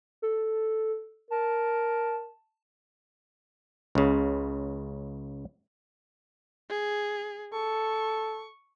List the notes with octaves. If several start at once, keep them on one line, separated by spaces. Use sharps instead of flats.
A4
A#4 A5
C#2 C#3
G#4
A4 C#6